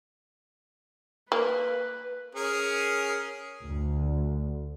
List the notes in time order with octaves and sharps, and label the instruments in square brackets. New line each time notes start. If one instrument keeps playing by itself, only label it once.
[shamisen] A#3 [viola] B4
[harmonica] C#4 G#4 A#4
[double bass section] D2